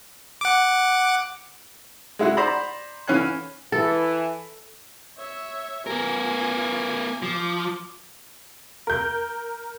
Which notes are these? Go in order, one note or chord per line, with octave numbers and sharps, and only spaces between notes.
F#5 D6
G#3 E4 F#4
C5 D5 A#5 B5
E3 C#4 F5 F#6
E3 A4
C#5 E5
B3 F4 A#4 G#5
F3 D6
A#4 G6